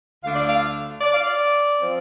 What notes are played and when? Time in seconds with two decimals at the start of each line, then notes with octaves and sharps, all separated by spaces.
0.22 D2 D3 A3 D4 F5
0.35 D5
0.49 F5
1.01 D5
1.14 F5
1.28 D5
1.80 F3 C4